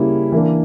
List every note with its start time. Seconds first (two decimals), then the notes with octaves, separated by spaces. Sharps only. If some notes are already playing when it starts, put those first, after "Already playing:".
Already playing: C#3 G3 A#3 C#4 E4
0.32 E3 A#3 D4